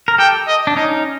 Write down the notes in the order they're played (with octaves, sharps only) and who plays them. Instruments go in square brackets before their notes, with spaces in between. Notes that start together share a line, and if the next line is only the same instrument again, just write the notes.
[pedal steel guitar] A#4
[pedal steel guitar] G4 A4 [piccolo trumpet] G5
[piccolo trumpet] D#5
[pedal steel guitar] D4
[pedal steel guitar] C#4 D#4 [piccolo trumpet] D#5